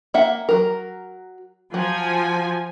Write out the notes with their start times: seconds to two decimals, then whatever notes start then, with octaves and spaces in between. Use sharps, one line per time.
0.14 A#3 E5 F#5
0.49 F#3 A#4
1.74 F3 F#3 G#5